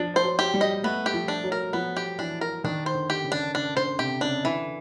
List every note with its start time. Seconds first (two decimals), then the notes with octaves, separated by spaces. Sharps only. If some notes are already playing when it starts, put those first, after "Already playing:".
Already playing: F3 D4
0.16 C5
0.24 F#3
0.39 G4
0.54 G3
0.61 D#5
0.84 A3 B3
1.06 G4
1.14 F3
1.28 D4
1.44 F#3
1.52 A#4
1.73 F3 B3
1.97 G4
2.19 E3 D4
2.41 A#4
2.64 D#3 D4
2.86 C5
2.95 D3
3.10 G4
3.24 C#3
3.32 D4
3.54 C#3 D4
3.77 D3 C5
3.99 C3 G4
4.21 C#3 D4
4.44 D3 E3